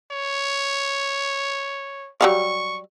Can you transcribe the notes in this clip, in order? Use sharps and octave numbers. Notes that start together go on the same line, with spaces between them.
C#5
F#3 G3 F5 C#6